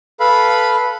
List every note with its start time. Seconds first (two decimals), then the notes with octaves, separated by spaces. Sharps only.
0.20 A4 B4 F5 B5